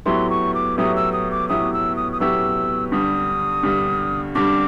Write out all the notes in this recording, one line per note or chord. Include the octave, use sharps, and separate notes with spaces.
A2 F#3 B3 E4 G4 C6
C#6
D6
A2 F#3 B3 E4 G4 D#6
E6
D#6
D6
A2 F#3 B3 E4 G4 D#6
E6
D#6
D#6
A2 F#3 B3 E4 G4 E6
G2 D3 G3 D#6
G2 D3 G3
G2 D3 G3 D6